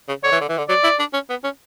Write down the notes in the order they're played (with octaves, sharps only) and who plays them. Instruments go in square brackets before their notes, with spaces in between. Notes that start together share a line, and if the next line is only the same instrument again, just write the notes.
[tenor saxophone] C#3
[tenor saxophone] D3 [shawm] C#5
[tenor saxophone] E3
D3
E3
D3
[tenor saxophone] F#3 [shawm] D5
[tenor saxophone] E4
D4
C#4
B3
C#4